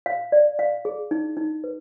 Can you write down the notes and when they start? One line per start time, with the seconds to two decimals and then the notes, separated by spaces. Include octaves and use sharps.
0.06 F5
0.32 D5
0.59 F5
0.85 G#4
1.11 D#4
1.37 D#4
1.64 B4